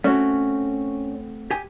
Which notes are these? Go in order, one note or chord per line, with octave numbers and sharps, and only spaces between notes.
A3 C4 C#4 F#4
G4 G#5